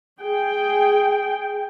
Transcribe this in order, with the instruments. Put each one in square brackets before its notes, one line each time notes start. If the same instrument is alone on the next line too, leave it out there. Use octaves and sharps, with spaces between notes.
[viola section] G#4 G5